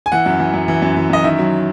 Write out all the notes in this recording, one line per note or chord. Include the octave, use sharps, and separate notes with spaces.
G#5
E3 F#5
F#2
E3
F#2
E3
F#2
E3
F#2 D#5
D#3 E5
F#3